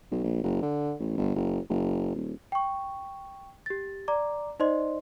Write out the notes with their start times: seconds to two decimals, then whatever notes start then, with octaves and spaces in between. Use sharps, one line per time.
0.11 B1
0.24 A#1
0.44 F#1
0.62 D3
1.00 A1
1.18 G1
1.35 F#1
1.70 F#1
2.15 D#1
2.52 G5 C#6
3.66 G4 A6
4.08 D5 A#5 D6
4.60 D#4 C5 D5 D#5 C6